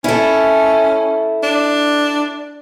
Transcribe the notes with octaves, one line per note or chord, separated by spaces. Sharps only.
C#4 E4 A4
D4